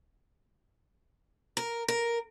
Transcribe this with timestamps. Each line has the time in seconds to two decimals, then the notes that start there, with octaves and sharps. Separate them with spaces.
1.57 A#4
1.88 A#4